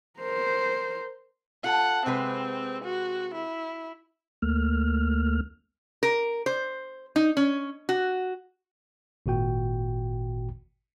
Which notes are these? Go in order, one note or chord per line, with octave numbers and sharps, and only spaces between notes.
A#4 C5
F4 A4 F#5
C3 G#3 C4 B4
F#4
E4
D2 A3 A#3 F6
A#4
C5
D#4
C#4
F#4
G#1 A#2 F#4 G5